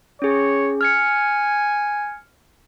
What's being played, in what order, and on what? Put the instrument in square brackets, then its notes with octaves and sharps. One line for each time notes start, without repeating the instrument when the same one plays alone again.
[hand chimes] C#4 G#4 [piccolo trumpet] C#5
[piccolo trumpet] G#5 [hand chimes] F6 G#6 C#7